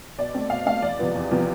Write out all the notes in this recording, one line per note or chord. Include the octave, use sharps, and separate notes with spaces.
B2 D5
A3 C4
B2 F5
A3 C4 F5
E2 D5
C3 F3 B3
E2
C3 F3 B3